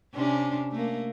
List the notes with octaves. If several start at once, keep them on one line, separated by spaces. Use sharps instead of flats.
C3 C#4 D4
A3 A#3